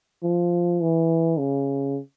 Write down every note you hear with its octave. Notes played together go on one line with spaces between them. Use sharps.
F3
E3
C#3